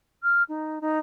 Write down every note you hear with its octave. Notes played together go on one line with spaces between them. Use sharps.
F6
D#4
D#4